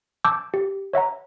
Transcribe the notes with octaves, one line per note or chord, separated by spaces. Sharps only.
A5 D6 E6 G6
G4
C#5 E5 F#5 A#5